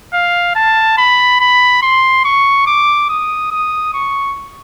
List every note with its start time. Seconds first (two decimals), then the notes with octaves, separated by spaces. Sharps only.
0.14 F5
0.55 A5
0.98 B5
1.40 B5
1.83 C6
2.25 C#6
2.67 D6
3.09 D#6
3.51 D#6
3.94 C#6